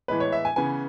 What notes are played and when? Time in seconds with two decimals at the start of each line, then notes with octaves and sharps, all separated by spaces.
0.08 A2 E3 G#3 B3 B4
0.20 C#5
0.32 E5
0.45 G#5
0.56 C#3 E3 B3 G#5